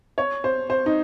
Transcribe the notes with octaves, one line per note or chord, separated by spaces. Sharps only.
C#5
C5
C5
D#4